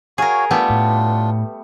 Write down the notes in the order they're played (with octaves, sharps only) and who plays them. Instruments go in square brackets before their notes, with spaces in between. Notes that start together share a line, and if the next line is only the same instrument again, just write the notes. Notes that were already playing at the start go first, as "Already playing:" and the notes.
[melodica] F#4 C#5 F5 [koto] G#4 A#4
[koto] G3 A3 B3 [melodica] D4 F4
[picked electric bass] A2